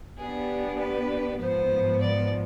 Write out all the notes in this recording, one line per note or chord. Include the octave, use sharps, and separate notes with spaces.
B3 D4 G4 G#4
B4
G#2 F3 B3 C5
D5